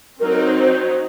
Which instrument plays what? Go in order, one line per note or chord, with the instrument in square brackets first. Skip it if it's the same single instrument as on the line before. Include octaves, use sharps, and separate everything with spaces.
[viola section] F#3 C4 D#4 [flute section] A#4
[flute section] A#4
C5
C5